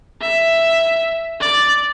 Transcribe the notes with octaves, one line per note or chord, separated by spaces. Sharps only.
E5
D5